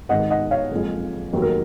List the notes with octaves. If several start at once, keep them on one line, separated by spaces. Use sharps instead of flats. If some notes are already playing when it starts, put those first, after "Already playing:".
G#1 G#2 D#3 G#3 D#5 F#5
D#5 F#5
C#5 F5
F#1 F2 F3 G#3
F1 D#2 D#3 F#3
A#4